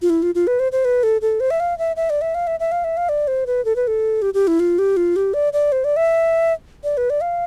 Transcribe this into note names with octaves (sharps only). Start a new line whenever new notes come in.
F4
E4
F4
F4
B4
C5
C5
B4
A4
A4
C5
E5
F5
E5
E5
D5
E5
F5
E5
E5
F5
E5
F5
D5
C5
B4
A4
B4
A4
G4
G4
E4
F4
G4
F4
G4
D5
D5
C5
D5
E5
D5
B4
D5
F5